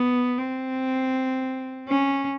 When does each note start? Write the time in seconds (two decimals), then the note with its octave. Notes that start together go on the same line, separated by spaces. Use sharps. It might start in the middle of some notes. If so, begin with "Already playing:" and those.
Already playing: B3
0.38 C4
1.88 C#4